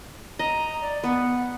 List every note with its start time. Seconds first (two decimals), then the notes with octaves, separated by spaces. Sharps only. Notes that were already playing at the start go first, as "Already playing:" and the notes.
0.39 D#5 A#5
0.81 D5
1.04 B3 F#5